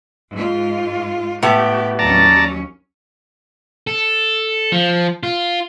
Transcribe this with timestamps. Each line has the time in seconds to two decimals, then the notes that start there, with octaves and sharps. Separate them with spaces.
0.32 G#2 F4
1.43 A2 B3 G4
1.99 D#2 F#3 C#4 D5 A5 A#5
3.87 A4
4.72 F3
5.23 F4